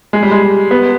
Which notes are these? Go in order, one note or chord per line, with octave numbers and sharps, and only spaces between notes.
G#3
G3
G#3
B3